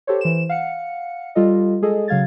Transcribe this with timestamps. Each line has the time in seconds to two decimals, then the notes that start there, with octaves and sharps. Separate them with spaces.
0.07 G4 A4 C5 C#5
0.21 E3 C5 E7
0.49 F5 F#5 C#7
1.35 G3 F4 A4 D#5
1.82 G#3 G#4 A4 D#5
2.08 C#3 F#3 F5 G#6 A6